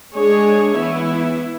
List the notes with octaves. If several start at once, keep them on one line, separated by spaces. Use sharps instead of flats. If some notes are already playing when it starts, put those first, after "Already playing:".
G#3 D4 G#4 C#5
E3 B3 E4